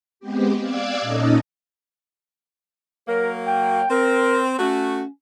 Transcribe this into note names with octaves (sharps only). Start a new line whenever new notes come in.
G#3 B3 C4 G4
D5 F5 D6 E6 F#6 G#6
A#2 C#4 D#4 A4 D#5
F#3 A#3 A#4
G5
C4 A#4
A3 C#4 F#4